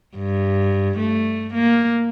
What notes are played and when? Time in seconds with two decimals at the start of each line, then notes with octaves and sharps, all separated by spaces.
0.16 G2
0.99 A3
1.54 A#3